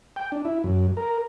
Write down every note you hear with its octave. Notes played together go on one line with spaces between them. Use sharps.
G5
D4
E4
F#2
A#4